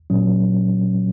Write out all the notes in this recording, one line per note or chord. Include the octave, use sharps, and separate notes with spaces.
A#2 F#3 C#4